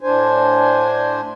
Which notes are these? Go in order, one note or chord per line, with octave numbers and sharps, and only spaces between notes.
A2 D4 C5 G#5